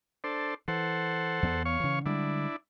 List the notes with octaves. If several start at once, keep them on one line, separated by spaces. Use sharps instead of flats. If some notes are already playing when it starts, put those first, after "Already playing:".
D4 A4 C5
E3 A4 C5 F#5
E2 A#3 B3
C#5 F5 C#6
C#3 E3
D3 G3 G#3 D4 E4